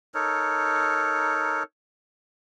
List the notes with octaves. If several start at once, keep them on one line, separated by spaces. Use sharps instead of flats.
D#4 A4 A#4 C#5